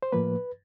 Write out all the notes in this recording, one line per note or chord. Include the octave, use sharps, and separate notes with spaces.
C5
A2 F3 A#3 B4